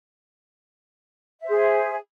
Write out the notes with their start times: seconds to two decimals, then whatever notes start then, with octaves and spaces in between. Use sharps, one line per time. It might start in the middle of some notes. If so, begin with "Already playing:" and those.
1.40 E5
1.44 C5
1.49 G#4